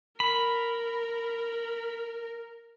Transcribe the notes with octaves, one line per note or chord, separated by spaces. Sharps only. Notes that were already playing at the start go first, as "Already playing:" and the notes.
A#4 B5